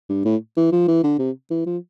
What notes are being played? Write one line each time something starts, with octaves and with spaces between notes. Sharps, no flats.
G2
A2
E3
F3
E3
D3
C3
E3
F3